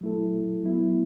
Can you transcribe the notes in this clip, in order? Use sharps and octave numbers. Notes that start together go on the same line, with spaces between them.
F#3 A3 E4 A4
F#3 B3 E4